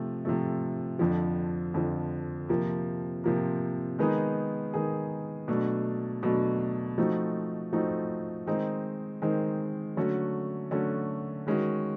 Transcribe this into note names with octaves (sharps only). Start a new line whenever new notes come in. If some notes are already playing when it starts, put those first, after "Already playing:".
Already playing: C3 F3 A3
C3 F3 A3
F2 D3 F3
F2 D3 F3
C3 F3 A#3
C3 F3 A#3
D#3 G#3 B3 D#4 G#4
D#3 G#3 B3 D#4 G#4
B2 F#3 A3 D4
B2 F#3 A3 D4
F3 A3 C4 D#4 F#4
F3 A3 C4 D#4 F#4
D#3 G#3 C4 D#4
D#3 G#3 C4 D#4
D3 F#3 A3 C#4 F#4
D3 F#3 A3 C#4 F#4
D#3 G#3 C#4 F#4